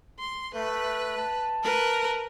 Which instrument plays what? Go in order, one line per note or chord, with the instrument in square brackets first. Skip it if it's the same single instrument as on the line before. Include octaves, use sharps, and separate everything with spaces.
[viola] C6
[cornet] A3 [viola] B4
[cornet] A5
[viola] A#4 B4